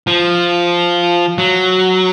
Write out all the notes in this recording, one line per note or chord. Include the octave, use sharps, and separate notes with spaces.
F3
F#3